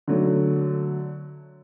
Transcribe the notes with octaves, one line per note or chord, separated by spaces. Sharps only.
D3 F#3 A3